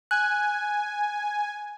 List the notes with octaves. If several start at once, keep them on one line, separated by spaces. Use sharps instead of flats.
G#5 F#6